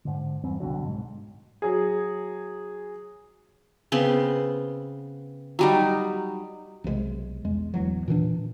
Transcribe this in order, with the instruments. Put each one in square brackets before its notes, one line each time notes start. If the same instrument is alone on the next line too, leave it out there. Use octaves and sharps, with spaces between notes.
[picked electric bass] G#2 D3
E2 G2 C4
C2 B2 D3 F#3
G#2
[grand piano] F#3 G#4
[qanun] C#3 B3 C4 C6
F#3 G3 D#4
[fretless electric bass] B1 C3 E3 G#3
E2 G#3
D1 E2 F#3
A#2 D#3 E3 D4